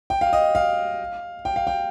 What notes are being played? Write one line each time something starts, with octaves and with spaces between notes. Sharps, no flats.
G5
F5
D#5
F5
G5
F5
G5